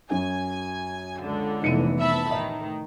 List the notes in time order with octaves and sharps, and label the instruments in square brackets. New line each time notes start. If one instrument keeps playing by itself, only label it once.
[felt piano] F#2 F#3 [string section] G#5
[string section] C#2 D3
[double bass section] F1 E3 B3 [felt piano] D#4 C#7 D#7
[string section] E5 A5 B5
[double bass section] A1 [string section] D#3 [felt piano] E5